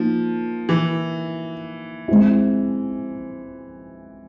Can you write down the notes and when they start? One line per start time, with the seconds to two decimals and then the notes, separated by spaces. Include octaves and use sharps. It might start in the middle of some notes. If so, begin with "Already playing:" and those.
Already playing: F3 A#3 D#4
0.69 E3
2.08 G#3 C4 E4